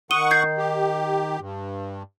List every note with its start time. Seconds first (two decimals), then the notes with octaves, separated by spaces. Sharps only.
0.11 D#3 F#5 C#6 D#6 D#7 G7
0.31 G6 G#6 C7
0.58 G4
1.40 G2